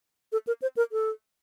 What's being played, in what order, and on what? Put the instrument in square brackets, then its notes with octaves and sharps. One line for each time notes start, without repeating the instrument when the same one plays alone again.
[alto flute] A4
A#4
C5
A#4
A4